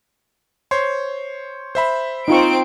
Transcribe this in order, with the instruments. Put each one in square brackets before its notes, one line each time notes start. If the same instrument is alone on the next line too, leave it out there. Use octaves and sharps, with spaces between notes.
[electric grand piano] C5 C#5 C6
C5 E5 B5
[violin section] C4 D7 [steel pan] D#4 F4 C#6